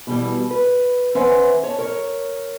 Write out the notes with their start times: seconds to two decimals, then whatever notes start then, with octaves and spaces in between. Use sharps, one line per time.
0.07 B2 E3 G3
0.51 B4
1.15 E3 C#4 B4 C5 E5 F#5
1.63 C#5 A5
1.78 A#4 C#5